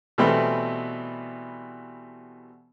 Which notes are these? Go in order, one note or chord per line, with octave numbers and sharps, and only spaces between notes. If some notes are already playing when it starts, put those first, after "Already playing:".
B2 E3 G3 A3 B3 C4